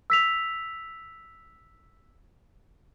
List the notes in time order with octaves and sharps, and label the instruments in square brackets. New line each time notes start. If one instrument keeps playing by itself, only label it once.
[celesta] E6 B6 F7